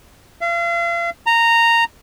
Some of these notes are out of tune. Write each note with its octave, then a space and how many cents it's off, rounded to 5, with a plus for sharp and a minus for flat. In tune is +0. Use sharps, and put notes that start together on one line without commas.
F5 -40
A#5 -10